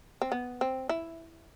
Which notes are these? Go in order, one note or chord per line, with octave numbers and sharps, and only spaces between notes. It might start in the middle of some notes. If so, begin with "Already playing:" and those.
C4
B3
C4
E4